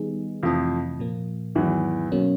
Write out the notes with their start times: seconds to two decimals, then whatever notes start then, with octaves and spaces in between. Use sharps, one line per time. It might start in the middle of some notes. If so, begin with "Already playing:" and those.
Already playing: D#3 G3 B3 D#4 G#4
0.43 F2 C3 E3 F3 A3 C4 E4
0.99 A#2 F3 A#3
1.55 E2 G#2 D#3 E3 F#3
2.12 B2 F#3 A#3 C#4